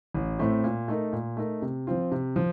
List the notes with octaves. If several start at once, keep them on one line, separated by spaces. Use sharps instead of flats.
A1
A2 A3 C4
A#2
A3 D#4 A#4
A#2
A3 D#4 A#4
C3
F3 C4 F4
C3
F3